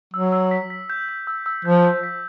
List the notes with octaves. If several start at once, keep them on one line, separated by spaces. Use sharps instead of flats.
F#3 E6
E6
B6
B6
G6
G6
E6
E6
F3 G6
G6
B6